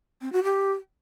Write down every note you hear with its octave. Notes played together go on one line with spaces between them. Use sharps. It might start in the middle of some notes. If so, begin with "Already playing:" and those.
C4
F#4
G4